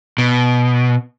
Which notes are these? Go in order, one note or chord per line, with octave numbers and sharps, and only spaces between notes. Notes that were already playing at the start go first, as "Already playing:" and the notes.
B2